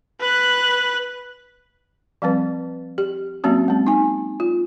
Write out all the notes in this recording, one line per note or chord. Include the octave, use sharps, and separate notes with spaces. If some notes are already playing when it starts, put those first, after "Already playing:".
B4 F#6
F3 G3 C4 B4
G4
F#3 A#3 C4 C#4 F#4
G#3 C4
D#4 G#5
F4